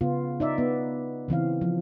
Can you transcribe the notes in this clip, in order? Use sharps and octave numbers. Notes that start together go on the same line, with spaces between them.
C#3 B3 F4
D#4 D5 E5
B3
C#3 E3 C4 F5
F3